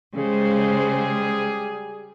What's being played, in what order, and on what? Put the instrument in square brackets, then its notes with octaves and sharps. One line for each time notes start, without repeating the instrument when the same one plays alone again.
[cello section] C#3 G#3 C5 [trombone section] G3 G#4